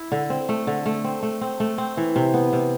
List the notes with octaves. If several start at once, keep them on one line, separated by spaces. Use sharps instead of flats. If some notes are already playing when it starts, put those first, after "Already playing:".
Already playing: E4
D3
C4
A3
D3
A3
C4
A3
C4
A3
C4
E3
C3
B3
C3